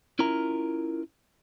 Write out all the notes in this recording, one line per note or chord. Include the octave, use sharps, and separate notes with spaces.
C#4 E4 F4 A#4 A#5